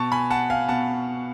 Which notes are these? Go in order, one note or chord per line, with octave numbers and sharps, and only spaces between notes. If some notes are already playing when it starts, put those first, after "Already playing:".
Already playing: B2 A5 C#6
G#5 B5
F#5 A5
F5 G#5
B2 F#5 A5